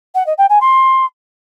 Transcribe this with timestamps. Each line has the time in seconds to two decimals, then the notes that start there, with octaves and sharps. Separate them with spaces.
0.15 F#5
0.26 D#5
0.38 G5
0.49 G#5
0.61 C6